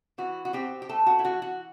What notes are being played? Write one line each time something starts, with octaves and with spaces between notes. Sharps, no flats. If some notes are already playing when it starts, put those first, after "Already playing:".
E3 F#4
F#4
C4 G4
G4
A3 A4
F#4
E4
E3 F#4
F#4